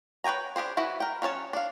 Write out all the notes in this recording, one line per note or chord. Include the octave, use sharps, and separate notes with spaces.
B4 C#5 G5 G#5 A#5
D4 G4 G#4 C5
E3 E4 F#4 B4
A#4 G5
F#3 C#4 C#5 A5
D4 F5